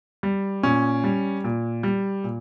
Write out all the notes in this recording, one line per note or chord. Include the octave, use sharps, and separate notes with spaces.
G3
A#2 C#4
G3
A#2
G3
A#2